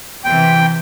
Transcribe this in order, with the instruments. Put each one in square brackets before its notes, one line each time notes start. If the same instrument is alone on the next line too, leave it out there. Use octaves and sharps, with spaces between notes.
[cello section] C3 E3 [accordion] G5